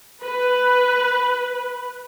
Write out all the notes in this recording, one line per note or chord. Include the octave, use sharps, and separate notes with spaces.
B4